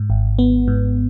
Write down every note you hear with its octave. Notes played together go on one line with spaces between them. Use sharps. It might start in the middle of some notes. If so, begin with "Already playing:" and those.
Already playing: G#2
G#1
B3
G#2